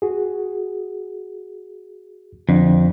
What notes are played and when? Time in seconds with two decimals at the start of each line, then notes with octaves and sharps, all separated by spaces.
0.02 F#4 G#4
2.49 F2 D3 D4